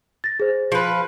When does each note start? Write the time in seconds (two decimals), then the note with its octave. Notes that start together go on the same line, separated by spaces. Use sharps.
0.24 A6 A#6
0.40 G#4 C5
0.72 F3 B4